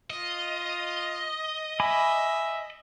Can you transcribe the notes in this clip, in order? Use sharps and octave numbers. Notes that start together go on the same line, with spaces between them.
F4 D#5
E5 G#5 B5 D6